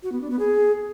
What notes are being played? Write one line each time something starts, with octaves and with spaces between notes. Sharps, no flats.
F#4
B3
D4
B3
G#4